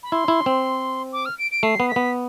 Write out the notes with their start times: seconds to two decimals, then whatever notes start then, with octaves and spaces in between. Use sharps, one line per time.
0.03 B5
0.12 E4 C6
0.28 E4
0.46 C4
1.12 D6
1.25 F6
1.38 D7
1.51 D7
1.63 A3 C7
1.80 B3
1.89 B6
1.96 B3